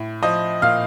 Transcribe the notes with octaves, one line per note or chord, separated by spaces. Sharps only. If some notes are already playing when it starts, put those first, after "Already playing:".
Already playing: A2
F3 D#5 D#6
A#2 F5 F6